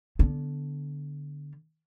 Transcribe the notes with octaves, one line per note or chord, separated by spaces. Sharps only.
D3 B3